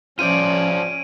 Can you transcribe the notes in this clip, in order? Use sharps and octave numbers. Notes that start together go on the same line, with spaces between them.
F3 C#4 F4 C5 D5 D7 D#7